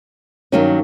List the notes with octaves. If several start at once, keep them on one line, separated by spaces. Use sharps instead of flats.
G2 D#3 F#3 A#3 C#4